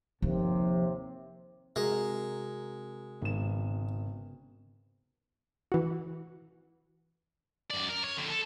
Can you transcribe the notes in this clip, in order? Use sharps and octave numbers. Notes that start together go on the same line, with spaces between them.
D#2 C3 F3
C3 G#3 F#4 A#4
G#1 C#3 B3 E7
E3 F#4
F#2 D5
A#4
C#5
F2 D3
A4